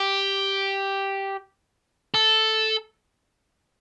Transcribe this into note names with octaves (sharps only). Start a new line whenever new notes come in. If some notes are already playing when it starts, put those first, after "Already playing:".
Already playing: G4
A4